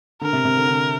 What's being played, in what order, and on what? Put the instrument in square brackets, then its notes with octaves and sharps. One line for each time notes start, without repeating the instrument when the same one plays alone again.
[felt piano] D3 [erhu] A#4
[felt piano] C3
C3
D3
D3